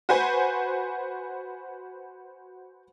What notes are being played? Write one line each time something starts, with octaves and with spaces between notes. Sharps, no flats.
F#4 B4 C5 G#5